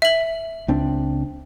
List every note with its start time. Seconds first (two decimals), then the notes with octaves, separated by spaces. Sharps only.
0.02 E5 F#7
0.68 C#2 C4 D4